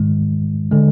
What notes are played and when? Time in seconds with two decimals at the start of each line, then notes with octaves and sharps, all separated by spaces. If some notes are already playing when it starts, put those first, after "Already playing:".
Already playing: G#2 D#3 G#3
0.72 D3 G#3